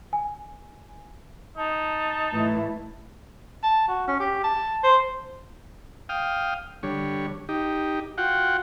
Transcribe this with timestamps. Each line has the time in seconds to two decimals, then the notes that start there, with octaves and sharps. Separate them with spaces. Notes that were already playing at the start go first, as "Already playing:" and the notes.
0.13 G#5
1.57 D#4 A5
2.32 A2 E3 E4
3.63 A5
3.88 F#4
4.08 C#4
4.20 G4
4.44 A5
4.84 C5
6.09 F5 G5 D#6 F6
6.83 D3 G3 C#5
7.49 D#4 G4
8.18 F4 F#4 F#5 G5